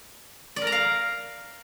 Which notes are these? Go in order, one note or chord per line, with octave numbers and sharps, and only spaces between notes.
D5
A#4
A#5
F5